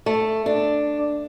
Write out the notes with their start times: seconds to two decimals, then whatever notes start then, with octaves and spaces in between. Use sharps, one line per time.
0.06 A3
0.46 D4